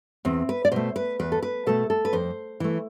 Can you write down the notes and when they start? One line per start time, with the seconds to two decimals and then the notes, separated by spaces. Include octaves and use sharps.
0.25 E2 C4
0.49 B4
0.65 D5
0.72 B2 A3 C5
0.96 B4
1.19 E2 B4
1.32 A4
1.43 B4
1.66 B2 A3 A4
1.90 A4
2.05 B4
2.13 F2 C5
2.60 E3 A3